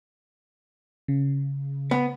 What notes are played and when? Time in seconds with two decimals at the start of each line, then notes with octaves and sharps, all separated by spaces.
1.08 C#3
1.91 B3